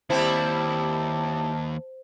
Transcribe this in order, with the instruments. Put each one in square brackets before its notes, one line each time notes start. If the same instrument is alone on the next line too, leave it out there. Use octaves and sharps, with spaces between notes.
[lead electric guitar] D#2 [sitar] G3 C4 E4 [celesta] C5 [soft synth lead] A5